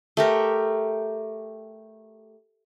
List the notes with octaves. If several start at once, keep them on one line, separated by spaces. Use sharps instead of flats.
A3 G4 A#4